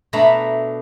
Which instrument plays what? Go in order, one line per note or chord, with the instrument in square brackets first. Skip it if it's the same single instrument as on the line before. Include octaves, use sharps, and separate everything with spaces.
[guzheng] B2 A3 D4 E5 A#5 B5